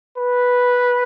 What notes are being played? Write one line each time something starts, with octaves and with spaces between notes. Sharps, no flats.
B4